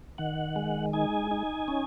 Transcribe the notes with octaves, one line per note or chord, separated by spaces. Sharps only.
D#3 F#5
G#3
D#4 G#5
D#4
C#4